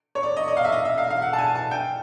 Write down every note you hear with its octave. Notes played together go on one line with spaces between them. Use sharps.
C#5
D5
D#5
D5
F5
E5
D#5
E5
F5
F5
F#5
A5
G#5
A5
G5